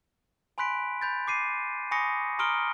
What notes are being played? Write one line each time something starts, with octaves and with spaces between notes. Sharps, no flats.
G#5 B5 C6 F#6 B6 D7
B5 G6 A6
D6 C7 D#7
G#5 B5 C#6 D#6 A#6 C#7
A#5 C6 D#6 F6 D7 G7